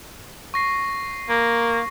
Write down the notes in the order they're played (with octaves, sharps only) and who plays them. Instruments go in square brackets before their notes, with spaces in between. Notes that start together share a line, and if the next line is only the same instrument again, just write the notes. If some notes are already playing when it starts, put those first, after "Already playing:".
[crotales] C#6 A#6 C7
[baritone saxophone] A#3